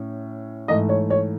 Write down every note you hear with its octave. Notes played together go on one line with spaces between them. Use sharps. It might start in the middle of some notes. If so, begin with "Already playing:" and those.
Already playing: A2 C#4
G#2 E3 A3 D#5
C#5
C#5